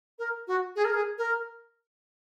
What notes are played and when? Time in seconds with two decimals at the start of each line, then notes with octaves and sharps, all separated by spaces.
0.19 A#4
0.48 F#4
0.76 G#4
0.85 A#4
0.94 G#4
1.18 A#4